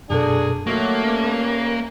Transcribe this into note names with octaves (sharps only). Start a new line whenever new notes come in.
F#2 B2 A#3 D4 F#4 G#4 A4
A#2 D#3 F#3 A3 A#3 C#6
E3 G3 C#4